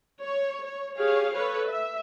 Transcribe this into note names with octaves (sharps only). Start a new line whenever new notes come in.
C#5
C#5
G4 G#4 C#5 F5
A4 B4 C#5
E5